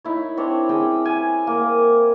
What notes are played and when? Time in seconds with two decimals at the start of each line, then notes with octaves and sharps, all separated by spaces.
0.05 D#4 E4 C#5
0.37 C4 D4 C#5
0.69 C4 C#4 G#4 G5
1.06 G#5
1.47 A#3